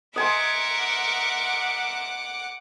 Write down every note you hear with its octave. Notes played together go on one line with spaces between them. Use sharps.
A#4 D#5 E5 F#5 G#5 C6 D6